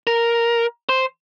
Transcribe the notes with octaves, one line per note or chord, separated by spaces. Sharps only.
A#4
C5